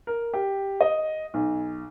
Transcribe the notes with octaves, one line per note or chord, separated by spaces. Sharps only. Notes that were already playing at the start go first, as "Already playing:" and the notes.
A#4
G4
D#5
B1